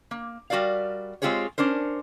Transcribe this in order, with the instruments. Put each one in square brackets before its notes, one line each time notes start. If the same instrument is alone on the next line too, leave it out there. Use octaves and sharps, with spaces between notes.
[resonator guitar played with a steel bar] A#3
G3 F#4 A#4 D5 F5
G#3 C4 F4 G4 G#4 C#5
C#4 D4 A#4 C5